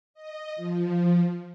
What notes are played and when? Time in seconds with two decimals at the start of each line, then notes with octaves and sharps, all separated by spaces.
0.14 D#5
0.56 F3